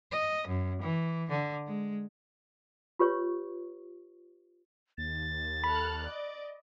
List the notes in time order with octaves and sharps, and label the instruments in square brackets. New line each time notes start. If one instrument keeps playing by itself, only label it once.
[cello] D#5
F#2
E3
D3
G#3
[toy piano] F4 G4 B4 C#5 C#6
[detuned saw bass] D#2 [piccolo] A6
[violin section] A4 F6 F#6 [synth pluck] B5
[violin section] D5 D#5